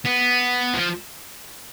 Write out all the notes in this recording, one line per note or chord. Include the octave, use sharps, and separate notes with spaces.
B3
F3